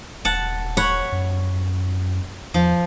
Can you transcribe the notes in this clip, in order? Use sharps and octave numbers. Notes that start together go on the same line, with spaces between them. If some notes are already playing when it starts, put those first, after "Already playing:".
D#1 F#5 A5
C#5 F#5 B5
F#2
E2 F3